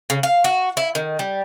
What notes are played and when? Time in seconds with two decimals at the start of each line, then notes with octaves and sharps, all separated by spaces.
0.10 C#3
0.23 F5
0.44 F#4
0.77 E4
0.95 D#3
1.19 G3